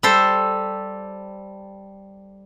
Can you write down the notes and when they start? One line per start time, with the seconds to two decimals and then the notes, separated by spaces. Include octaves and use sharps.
0.03 G3 A4 C5